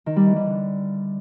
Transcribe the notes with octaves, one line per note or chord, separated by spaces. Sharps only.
D#3
G3
E3
G3
D3